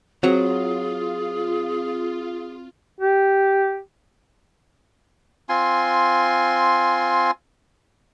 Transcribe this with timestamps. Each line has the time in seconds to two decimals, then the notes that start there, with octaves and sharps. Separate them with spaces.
0.23 F#3 C4 F4 G#4 A#5
3.00 G4
5.49 C4 F4 G#5 C6